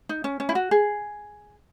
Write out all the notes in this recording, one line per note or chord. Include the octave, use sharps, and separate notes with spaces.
D#4
C#4
C#4
E4
F#4
G#4